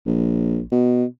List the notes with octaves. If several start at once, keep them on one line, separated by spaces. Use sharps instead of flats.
A#1
B2